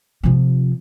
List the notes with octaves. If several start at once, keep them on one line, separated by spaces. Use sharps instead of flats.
C3 F3